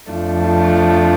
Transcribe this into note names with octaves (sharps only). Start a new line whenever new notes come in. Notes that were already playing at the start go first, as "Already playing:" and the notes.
F2 F3 A3 D4